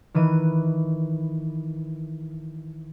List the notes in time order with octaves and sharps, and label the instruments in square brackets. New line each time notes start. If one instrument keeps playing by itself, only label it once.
[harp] D#3 E3 B4 D#7